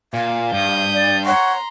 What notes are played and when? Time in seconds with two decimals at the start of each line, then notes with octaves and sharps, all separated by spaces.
0.14 A#2 F5
0.52 G2 D#6 G6
0.93 D5
1.26 C#5 F#5 A#5 C6 C#6